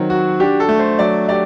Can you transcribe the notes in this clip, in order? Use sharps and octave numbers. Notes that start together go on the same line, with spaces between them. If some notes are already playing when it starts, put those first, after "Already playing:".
Already playing: D#3 F#3 C4
F#4
D4 G4
A4
A3
C5
F#3 D5
G4 D5